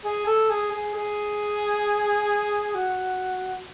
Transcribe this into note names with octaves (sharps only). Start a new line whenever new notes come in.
G#4
A4
G#4
G#4
G#4
F#4